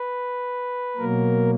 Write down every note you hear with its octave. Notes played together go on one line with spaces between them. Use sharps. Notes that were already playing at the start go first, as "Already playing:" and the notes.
Already playing: B4
B2 F#3 A#3 A#4